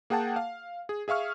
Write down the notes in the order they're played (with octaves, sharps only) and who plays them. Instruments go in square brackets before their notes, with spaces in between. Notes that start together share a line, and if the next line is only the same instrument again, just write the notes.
[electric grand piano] A#3 G#4 F#5 G5 A5
F5
G#4
G#4 E5 F5 C#6 F6